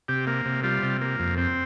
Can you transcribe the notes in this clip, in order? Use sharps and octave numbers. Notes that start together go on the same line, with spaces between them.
C3 G4
A#3
C3
G3 F4
C3
A#3
F2
C4